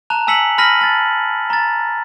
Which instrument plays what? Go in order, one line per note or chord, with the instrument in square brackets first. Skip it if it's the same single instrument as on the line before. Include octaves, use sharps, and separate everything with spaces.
[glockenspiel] A5 A#5 F#6 F7
G#5 A5 E6 B6 C#7 F#7
B5 F6 A#6 B6 D#7 F#7
A5 A6
A#5 A6